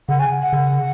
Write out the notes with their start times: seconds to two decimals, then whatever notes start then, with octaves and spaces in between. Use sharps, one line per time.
0.09 C#3 F#5
0.19 G#5
0.42 F#5
0.53 C#3